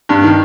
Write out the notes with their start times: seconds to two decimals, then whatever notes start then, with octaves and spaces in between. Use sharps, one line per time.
0.09 G2
0.24 D#3